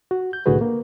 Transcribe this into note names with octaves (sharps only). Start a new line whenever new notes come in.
F#4
G6
C2 A2 D3 F#4 G#4 B4
A#3